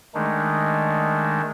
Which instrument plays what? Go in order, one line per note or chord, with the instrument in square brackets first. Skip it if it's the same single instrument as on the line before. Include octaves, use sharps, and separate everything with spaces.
[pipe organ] D#3 G#3 A3 D4 D#4